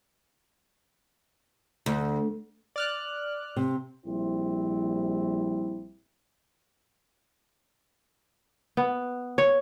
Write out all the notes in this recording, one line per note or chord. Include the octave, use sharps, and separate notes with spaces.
D2
D5 F6 F#6
C3
A#1 G3 C4 E4
B3
C#5